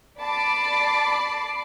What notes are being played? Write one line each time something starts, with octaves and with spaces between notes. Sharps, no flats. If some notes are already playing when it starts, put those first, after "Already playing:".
D5 A5 B5 D6 C7